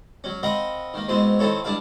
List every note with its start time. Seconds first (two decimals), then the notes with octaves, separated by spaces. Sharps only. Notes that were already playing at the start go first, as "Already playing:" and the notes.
0.24 F#3 C#4
0.43 C4 A#4 D#5 F5 F#5 B5
0.94 D#3 A#3
1.09 G#2 B2 C4 E4 C6
1.39 D#3 C4 E4 A4 C#5
1.64 G2 D4 E4 E5 F5